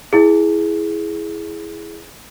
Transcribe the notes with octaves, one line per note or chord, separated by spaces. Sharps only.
E4 G#4